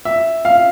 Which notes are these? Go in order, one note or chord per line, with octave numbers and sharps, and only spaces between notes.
E5
F5